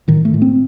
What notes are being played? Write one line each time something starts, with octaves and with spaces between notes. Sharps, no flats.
A2 D#3
A3
A2
C4